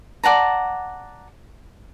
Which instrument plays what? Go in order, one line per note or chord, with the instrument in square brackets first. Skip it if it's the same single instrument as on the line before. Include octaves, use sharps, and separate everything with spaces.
[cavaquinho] D5 F#5 A5 A#5